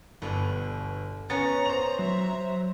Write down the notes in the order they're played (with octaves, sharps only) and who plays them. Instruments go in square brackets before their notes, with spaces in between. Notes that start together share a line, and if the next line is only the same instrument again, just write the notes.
[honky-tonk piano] G1 [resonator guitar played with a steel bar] B2 D3
[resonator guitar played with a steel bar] B3 C#4 C#5 [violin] A#5 [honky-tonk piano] A6
[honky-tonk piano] C5 F7
[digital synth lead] F#3 [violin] E5 A#5